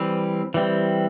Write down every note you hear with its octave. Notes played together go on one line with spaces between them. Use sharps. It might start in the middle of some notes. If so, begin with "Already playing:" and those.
Already playing: E3 G3 C4
E3 G3 C4